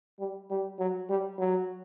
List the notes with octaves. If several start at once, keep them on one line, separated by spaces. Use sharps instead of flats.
G3
G3
F#3
G3
F#3